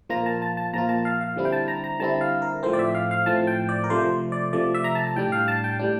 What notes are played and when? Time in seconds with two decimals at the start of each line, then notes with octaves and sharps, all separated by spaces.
0.09 A#2 F3 A#3 F4 A#5
0.26 A5
0.42 A5
0.57 A5
0.73 A#2 F3 A#3 F4 A#5
0.89 A5
1.05 F5
1.21 F5
1.36 D3 G3 C4 E4
1.45 G5
1.52 A5
1.68 A#5
1.84 A#5
1.99 D3 G3 C4 E4 A5
2.21 F5
2.42 A#4
2.63 A2 F3 A3 C4 C5
2.73 D5
2.79 E5
2.95 F5
3.11 F5
3.26 A2 F3 A3 C4 A5
3.47 G5
3.69 D5
3.84 A#4
3.90 C3 F3 A3 C5
4.32 D5
4.53 C3 F3 A3 D5
4.75 E5
4.84 A#5
4.95 A5
5.07 A5
5.16 A2 G3 D4 G5
5.32 F5
5.48 A5
5.64 G5
5.79 A2 G3 D4